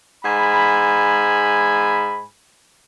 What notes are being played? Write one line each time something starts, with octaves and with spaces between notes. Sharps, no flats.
G#2 G#5 B5